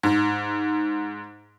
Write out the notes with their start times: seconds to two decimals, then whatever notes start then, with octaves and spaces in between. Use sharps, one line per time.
0.03 G#2